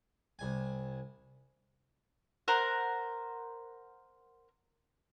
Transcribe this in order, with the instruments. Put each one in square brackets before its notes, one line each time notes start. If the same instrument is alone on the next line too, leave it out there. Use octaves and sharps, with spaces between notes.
[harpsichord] C2 G#5
[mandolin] A#4 C5 F#5